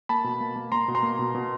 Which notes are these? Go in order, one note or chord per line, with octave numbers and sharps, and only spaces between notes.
A#3 A5 B5
B2
A#3
A#3
A#3 A#5 C6
B2
A#5 C6
A#3
B2
B2